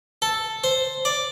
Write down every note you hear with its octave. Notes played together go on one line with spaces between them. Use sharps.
A4
C5
D5